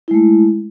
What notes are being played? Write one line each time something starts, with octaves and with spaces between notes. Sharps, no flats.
G#3 A3 E4